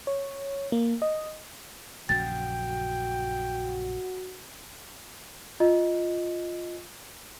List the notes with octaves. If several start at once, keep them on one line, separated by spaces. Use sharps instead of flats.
C#5
A#3
D#5
A#1 F#2 C#3 F#4 G5 A6
F4 D#5